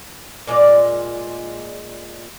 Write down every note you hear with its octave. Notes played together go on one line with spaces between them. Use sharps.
A#2 G#3 F4 D5